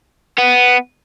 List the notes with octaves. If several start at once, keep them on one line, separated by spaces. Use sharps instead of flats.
B3